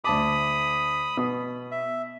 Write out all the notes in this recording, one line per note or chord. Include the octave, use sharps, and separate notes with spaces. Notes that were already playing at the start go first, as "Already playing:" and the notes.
D2 A5 B5 D6 D#6
B2 D#6
E5